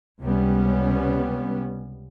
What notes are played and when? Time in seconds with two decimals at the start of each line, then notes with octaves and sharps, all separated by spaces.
0.21 C#2 C3 G3 B3 C#4